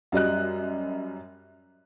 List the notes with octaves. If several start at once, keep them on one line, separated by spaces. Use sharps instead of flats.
F#2 G3 D#5 F#6